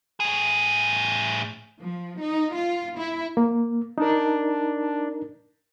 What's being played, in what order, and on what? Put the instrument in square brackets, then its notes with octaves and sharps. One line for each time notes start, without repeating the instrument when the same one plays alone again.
[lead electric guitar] A2 G#4
[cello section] F3
D#4
F4
E4
[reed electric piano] A#3
[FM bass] D4 [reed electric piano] D#4 A#4